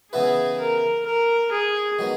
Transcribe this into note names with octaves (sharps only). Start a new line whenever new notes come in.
C#3 E3 B3 E4 G#4 B4
A#4
A#4
G#4
D#3 F#3 B3